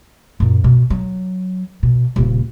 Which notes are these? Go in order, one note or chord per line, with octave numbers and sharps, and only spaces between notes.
F#2 A#2
B2
F#3
B2
D#1 C#3